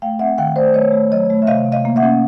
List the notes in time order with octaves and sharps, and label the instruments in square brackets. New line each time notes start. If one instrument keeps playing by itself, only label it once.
[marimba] A3 F5 G5
C4 E5 F#5
D#3 F5 G5
A3 C5 D5
A3 C#5 D#5
A3
F#3 C#5 D#5
A3
E5
C3 D#5 F5
C3
D#5 F5
A#3
E5 F#5
C#4